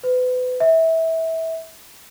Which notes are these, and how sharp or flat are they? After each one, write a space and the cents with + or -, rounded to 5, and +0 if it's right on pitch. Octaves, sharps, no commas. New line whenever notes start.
B4 +35
E5 -25